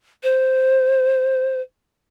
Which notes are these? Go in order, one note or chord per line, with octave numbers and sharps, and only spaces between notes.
C5